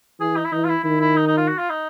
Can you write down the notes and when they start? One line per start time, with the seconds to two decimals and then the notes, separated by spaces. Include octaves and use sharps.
0.20 E3 G#4
0.37 D#4
0.45 E4
0.52 E3 D#4
0.64 F4
0.69 E4
0.84 D#3 E4
1.00 E4
1.17 D#4
1.27 D#4
1.37 F4
1.48 F#4
1.59 F4
1.70 D#4